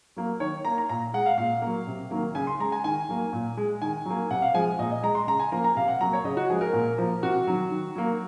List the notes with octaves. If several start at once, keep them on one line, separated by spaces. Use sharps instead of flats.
F#3 A#3
D#3 C#5
A#3 A#5
A#5
A#2 A#5
G#3 F#5
F5
A#2 F5
F#3 A#3
C3
D#3 F#3 A#3
C#3 G#5
C6
G#3 A#5
G#5
D#3 G#5
F#3 A#3
A#2
G#3
D#3 G#5
F#3
A#3
C3 F#5
F5
F3 G#3 G#5
A#2 D#5
D#5
G#3 A#5
C6
C#3 A#5
G#5
F3 A#3 A#5
A#5
C3 F5
F#5
F#3 A#3 A#5
C#5
C#3 D#5
F#4
F3 G#3 G#4
A#4
A#2
F3 A#3
C3 F#4
D#3 F#3
D#3
F#3 A#3